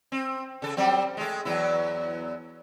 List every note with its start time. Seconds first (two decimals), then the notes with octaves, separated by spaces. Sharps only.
0.12 C4
0.62 C#3 A4
0.77 F#3 G3 C4
1.17 G#3 A3
1.45 E2 F#3 E4